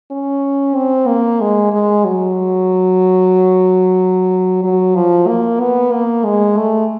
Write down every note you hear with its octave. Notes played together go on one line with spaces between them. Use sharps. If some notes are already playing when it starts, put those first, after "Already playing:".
C#4
C4
A#3
G#3
G#3
F#3
F#3
F3
A#3
B3
A#3
G#3
A3